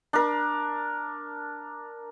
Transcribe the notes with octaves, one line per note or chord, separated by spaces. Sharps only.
D4 A#4